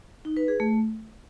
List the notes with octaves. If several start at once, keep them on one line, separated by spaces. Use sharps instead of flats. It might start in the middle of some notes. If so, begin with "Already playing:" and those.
D#4
B4
G#4
A3